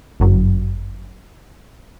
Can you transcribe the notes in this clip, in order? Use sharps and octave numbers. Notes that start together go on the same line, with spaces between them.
G1 F#2 F#3